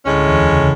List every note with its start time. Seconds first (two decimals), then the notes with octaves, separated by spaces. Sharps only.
0.05 D2 A2 D3 G#3 C#4
0.26 E2 E3
0.47 C#3
0.58 C#3